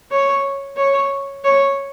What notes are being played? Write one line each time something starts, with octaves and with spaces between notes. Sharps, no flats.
C#5
C#5
C#5